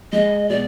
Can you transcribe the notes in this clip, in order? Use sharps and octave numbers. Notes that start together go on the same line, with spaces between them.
G#3 D#5
B2 D5